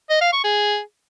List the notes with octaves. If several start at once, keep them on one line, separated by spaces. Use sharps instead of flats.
D#5
F5
C#6
G#4